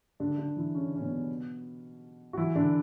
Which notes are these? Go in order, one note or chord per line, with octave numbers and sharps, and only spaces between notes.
D3 D4
D3 D4
E3 E4
C#3 C#4
C#4
B2 B3
F#4
E3 E4
D3 D4